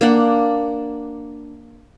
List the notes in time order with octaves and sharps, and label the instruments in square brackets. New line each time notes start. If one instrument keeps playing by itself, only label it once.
[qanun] A#3 D4 F#5